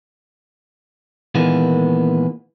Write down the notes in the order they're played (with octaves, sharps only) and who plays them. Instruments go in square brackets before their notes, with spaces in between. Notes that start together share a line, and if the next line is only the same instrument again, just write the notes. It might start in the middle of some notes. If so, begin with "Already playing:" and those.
[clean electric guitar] A#2 D#3 E3 G#3 A#3 B3